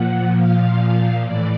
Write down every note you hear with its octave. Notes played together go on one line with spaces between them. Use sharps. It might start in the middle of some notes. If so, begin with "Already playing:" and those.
Already playing: A#2 F3 F#5
F5
A2 E3 D5